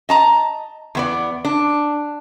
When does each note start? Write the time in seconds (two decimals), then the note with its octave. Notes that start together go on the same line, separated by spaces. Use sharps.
0.09 D#5 A5 A#5
0.95 E2 B3 D5
1.45 D4